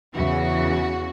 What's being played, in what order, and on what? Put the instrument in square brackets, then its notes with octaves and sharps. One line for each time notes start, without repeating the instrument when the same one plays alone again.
[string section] E2 C#3 E3 F#4